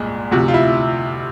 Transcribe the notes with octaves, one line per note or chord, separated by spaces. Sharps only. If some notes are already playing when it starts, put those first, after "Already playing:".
Already playing: C2 A#2 G#3
D2 C3 F3 F#4
F4
E4